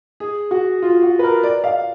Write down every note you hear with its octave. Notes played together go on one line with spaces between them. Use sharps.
G#4
F#4
F4
F#4
B4
A#4
D5
F5